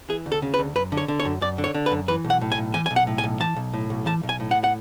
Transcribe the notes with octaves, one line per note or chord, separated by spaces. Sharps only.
E3 G#4
D2
A4
C#3
B4
D2
F#2 B4
D3
C#5
D3
C#5
F#2
F#2 D5
D3
C#5
D3
B4
F#2
E3 B4
B1
F#5
A2
G#5
B1
E3 G#5
B1 G#5
F#5
A2
G#5
B1
E3 A5
B1
A2
B1
E3 A5
B1
G#5
A2
F#5
F#5